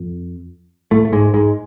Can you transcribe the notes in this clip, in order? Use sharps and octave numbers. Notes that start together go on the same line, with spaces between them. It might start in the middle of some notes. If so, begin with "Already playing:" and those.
Already playing: F2
A2 A3
A3
G#2 G#3
G#2 G#3